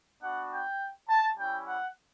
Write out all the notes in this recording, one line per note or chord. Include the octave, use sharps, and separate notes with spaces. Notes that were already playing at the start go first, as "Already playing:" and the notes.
B3 D4 F#4 F#5
G5
A5
G3 C#4 E4 G5
F#5